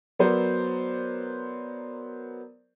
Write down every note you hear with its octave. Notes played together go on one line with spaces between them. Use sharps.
F#3 B3 A#4 C5 D5